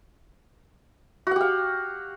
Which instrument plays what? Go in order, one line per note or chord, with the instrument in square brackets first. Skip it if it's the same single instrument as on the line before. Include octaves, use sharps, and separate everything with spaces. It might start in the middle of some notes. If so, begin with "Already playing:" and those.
[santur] F#4
F#5
G4
F5